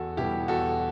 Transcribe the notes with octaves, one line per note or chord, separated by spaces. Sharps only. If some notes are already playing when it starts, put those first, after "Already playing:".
Already playing: E2 F#4 A4
B2 G3 B3 E4 G4
E2 F#4 A4